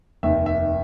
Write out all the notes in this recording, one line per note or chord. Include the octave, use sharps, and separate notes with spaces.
F1 D#2 D#3 E5
E5